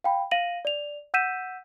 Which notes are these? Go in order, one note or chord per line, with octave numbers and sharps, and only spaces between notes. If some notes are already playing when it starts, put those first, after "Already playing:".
F5 G5 B5
F5 A#6 D#7 F#7
D5 F7
F#5 E6 G6 B6 D#7 E7